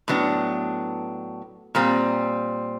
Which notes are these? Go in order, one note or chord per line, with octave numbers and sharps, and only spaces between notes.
A2 F#3 B3 D4
A#2 G3 C4